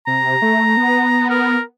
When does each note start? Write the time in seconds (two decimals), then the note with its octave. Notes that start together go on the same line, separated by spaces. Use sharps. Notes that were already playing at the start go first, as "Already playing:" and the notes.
0.07 C3 A#5
0.42 A3
0.77 B3
1.30 A#4